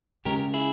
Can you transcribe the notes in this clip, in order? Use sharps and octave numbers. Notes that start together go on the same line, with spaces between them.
C#3 G#3 C#4 G4 A#4
E4 G#4